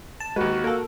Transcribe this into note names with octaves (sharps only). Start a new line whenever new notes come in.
A5
D#2 G#3 F#4 B4
A#3 A4 A#4